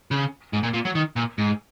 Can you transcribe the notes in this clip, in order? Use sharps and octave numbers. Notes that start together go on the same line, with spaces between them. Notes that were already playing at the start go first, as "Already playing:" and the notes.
C#3
G#2
A#2
A#2
F#3
D#3
A#2
G#2